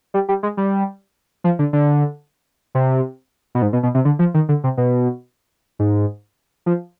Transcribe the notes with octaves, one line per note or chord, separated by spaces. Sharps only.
G3
G3
G#3
G3
F3
D3
D3
C3
B2
G#2
B2
B2
C3
D3
F3
D#3
D3
C3
B2
G#2
F3